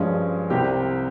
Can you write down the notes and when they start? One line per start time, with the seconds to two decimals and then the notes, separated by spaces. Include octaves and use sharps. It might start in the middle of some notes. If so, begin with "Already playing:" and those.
Already playing: G2 F3 G#3 C#4
0.50 C2 C3 G3 C4 G4